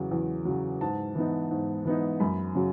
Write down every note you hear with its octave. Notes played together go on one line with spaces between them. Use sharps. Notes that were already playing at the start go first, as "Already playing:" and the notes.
Already playing: E2 C#3 F#3
E2
C#3 F#3
G#2 A5
E3 B3 D#4
G#2
E3 B3 D#4
F#2 B5
C#3 F#3 C#4